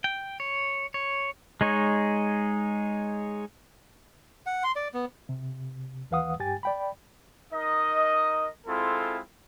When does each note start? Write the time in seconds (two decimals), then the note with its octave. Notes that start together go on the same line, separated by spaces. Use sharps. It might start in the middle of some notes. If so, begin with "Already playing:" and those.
0.04 G5
0.40 C#5
0.94 C#5
1.61 G#3 D#4 C#5
4.46 F#5
4.64 C6
4.76 D5
4.94 B3
5.29 C3
6.11 D#2 E3 B4 F5 F#5 D#6
6.40 G2 G4 G5 G#5 A6
6.63 D5 G5 B5
7.52 D#4 A#4 D#5
8.67 G#3 C4 E4 F4 A4